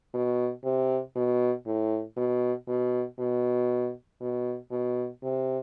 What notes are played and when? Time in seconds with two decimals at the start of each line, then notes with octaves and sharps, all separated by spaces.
0.14 B2
0.64 C3
1.16 B2
1.67 A2
2.17 B2
2.68 B2
3.19 B2
4.20 B2
4.72 B2
5.23 C3